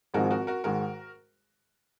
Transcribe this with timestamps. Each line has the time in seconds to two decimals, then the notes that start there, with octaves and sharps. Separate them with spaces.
0.14 G#1 G#2 F3 G#3 D#4 F#4 A#4
0.31 F#4 A#4
0.47 F#4 A#4
0.64 G#2 D#3 G#3 F#4 A#4